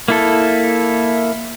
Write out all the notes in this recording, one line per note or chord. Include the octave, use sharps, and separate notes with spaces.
A#3 E4 A4